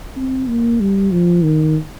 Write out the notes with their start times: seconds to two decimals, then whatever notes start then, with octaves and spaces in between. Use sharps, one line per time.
0.16 C4
0.48 A#3
0.80 G3
1.11 F3
1.44 D#3